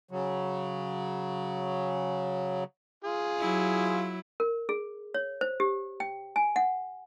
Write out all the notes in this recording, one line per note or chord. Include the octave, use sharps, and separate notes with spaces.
C#3 F#3
F4 G#4
F#3 E4
A#4
G#4
C#5
C5
G4
G5
G#5
F#5